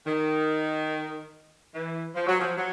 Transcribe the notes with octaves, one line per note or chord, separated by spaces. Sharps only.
D#3
E3
F3
F#3
F3
F#3